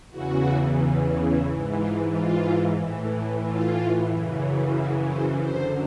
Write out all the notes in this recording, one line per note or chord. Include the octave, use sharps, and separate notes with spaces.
E2 C#3 E3 F#4
G#2 E3
F4
F4
A2 E3
F4
F#2 C#3 E3
F#4
C5
F#2 D3 C5